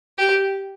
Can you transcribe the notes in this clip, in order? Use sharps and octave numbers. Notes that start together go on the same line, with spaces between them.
G4